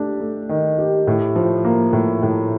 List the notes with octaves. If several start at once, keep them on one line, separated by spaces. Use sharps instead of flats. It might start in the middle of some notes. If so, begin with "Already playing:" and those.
Already playing: A3 D4 G4
A3
D#3
G4
A2
F3
A#3
A2
A2